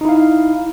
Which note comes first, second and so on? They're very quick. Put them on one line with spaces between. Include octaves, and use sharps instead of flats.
D#4 E4 F5